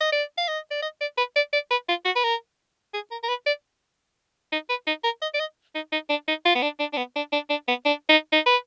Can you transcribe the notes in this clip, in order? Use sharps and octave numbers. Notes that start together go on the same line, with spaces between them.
D#5
D5
F5
D#5
D5
D#5
D5
B4
D5
D5
B4
F4
F#4
B4
A#4
G#4
A#4
A#4
B4
D5
D#4
B4
D#4
A#4
D#5
D5
D#5
D#4
D#4
D4
D#4
F4
B3
D4
D4
D4
B3
D4
D4
D4
B3
D4
D#4
D#4
B4